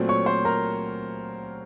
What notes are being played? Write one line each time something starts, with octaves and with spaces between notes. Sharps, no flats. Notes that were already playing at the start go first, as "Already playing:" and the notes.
Already playing: A#2 F#3 A3 C4
C#5 C#6
C5 C6
A#4 A#5